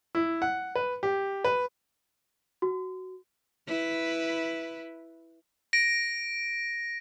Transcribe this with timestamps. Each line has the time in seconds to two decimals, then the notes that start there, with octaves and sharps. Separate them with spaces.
0.15 E4
0.42 F#5
0.75 B4
1.03 G4
1.44 B4
2.62 F#4
3.67 E4 B4
5.73 A#6 D7